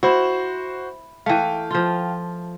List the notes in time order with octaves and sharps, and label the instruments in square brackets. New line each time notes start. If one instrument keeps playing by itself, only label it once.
[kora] E4 [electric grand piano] F#4 C5
[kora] E3 A3 [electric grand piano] F5 G5
[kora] F3 F4